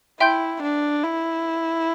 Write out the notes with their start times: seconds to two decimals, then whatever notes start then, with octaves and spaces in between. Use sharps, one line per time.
0.20 E4 E5 G5 C6 G6
0.62 D4
1.03 E4